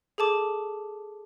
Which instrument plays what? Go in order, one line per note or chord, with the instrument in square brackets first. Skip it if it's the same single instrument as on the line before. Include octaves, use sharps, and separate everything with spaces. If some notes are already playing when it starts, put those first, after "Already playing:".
[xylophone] G#4 A4 A5 D6